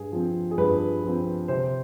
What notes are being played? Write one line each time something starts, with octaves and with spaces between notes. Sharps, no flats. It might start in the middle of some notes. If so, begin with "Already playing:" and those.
Already playing: G2 G#4
F3 C4
G#4
G2 B4
F3 C4
C3 C5